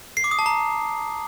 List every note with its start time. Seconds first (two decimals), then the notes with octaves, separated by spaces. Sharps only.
0.17 C7
0.24 D6
0.31 D#6
0.39 A5
0.46 A#5